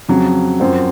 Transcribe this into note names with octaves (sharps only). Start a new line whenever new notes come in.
F2 C#3 F#3
F#2 F3 C4 F#4